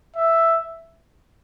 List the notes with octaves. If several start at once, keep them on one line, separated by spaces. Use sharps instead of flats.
E5